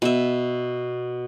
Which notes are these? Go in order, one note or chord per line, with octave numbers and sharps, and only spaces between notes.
B2 E5